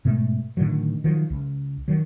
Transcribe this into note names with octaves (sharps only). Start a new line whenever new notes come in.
G#2 B2 G#3 A3
A2 D3 D#3 F#3
D#3 F3 F#3
C#2
D#3 F#3